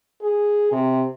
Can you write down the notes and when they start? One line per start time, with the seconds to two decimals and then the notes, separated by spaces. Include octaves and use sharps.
0.22 G#4
0.72 C3